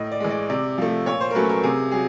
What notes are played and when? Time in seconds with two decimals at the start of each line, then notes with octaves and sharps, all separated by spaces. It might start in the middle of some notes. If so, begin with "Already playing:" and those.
Already playing: A2 D#5
0.12 D5
0.20 E3 G#3
0.30 D5
0.50 C3 D5
0.78 F3 A3
1.06 A#2 C#5
1.21 C5
1.31 A#4
1.35 F#3 A3 C#4 B4
1.49 A#4
1.63 C3 G#4
1.92 F#3 G#4